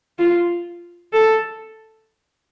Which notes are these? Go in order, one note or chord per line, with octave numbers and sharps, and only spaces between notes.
F4
A4